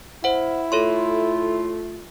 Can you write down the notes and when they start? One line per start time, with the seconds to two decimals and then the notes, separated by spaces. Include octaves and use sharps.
0.24 E4 C5 F#5
0.72 A3 F4 A4 C#5 C6